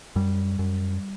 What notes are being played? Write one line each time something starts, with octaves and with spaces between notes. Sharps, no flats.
F#2 G3
F#2